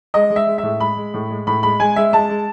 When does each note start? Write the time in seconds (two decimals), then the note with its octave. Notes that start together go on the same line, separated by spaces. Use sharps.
0.14 G#3 D#5
0.30 G#3
0.36 E5
0.47 G#3
0.58 A2 E5
0.80 G#3 B5
0.97 G#3
1.14 A2
1.30 G#3
1.47 A2 B5
1.63 G#3 B5
1.80 G#3 G#5
1.96 G#3 E5
2.13 G#3 A5
2.29 G#3